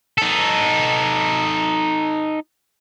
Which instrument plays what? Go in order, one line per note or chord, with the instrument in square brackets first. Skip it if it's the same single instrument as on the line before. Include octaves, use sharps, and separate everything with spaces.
[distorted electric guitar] D#4 A4